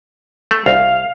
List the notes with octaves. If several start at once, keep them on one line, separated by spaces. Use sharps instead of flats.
A3
C2 F5